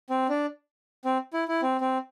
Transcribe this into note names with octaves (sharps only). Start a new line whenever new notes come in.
C4
D4
C4
E4
E4
C4
C4